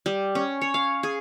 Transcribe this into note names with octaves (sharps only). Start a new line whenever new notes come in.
G3
C#4
C#5
F5
G#4